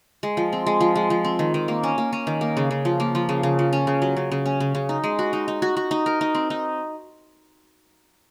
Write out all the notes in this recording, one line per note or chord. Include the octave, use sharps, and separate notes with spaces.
G#3
F3
C4
G#3
F3
G#3
F3
C4
D#3
D#3
A#3
C#4
A#3
C#4
D#3
A#3
C#3
C#3
F3
A#3
F3
C#3
C#3
F3
C#4
C#3
F#3
C#3
C#3
C#4
C#3
C#3
D#4
G#3
F#4
D#4
D#4
F#4
F#4
D#4
A#4
D#4
C4
D#4